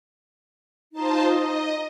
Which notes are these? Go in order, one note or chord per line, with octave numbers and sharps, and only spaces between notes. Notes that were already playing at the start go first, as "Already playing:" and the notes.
D#4 F4 C5 A5
D#5